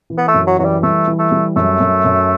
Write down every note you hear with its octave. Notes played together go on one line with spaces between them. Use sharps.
E3
B3
A3
F#2
F#3
E3 F#3
G3
G3 A3
E3
A3
G3
F#2 A3
F#2
F#2